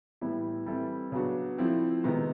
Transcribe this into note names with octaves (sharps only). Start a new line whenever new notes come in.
A2 E3 G3 B3 E4
E3 G3 C4 E4 A4
C#3 F#3 B3 D4 F#4
F3 A3 C4 E4
C3 D#3 G#3 B3